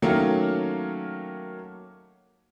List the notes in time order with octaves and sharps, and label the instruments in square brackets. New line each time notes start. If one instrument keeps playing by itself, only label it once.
[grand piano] D#3 F#3 A3 A#3 C#4